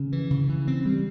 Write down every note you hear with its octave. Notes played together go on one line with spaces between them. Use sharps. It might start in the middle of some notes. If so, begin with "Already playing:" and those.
Already playing: C#3
E3
C#3
E3
C4
G3